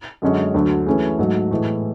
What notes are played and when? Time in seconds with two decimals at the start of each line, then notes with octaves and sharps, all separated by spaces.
0.22 F#2 D3 G#3 C#4 F#4
0.54 D2 D3 F#3
0.86 E3 A3 C#4 E4 G#4
1.19 G#2 F#3 A3
1.51 A2 E3 G#3